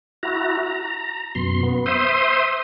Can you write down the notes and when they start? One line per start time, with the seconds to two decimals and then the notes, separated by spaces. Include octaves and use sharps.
0.23 E4 F#4 A#5
0.63 A#5
1.35 F#2 B2 C6
1.63 B3
1.86 C5 E5 C6 D#6